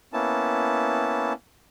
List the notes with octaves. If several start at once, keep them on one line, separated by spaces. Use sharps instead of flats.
A#3 B3 C#4 E4 A5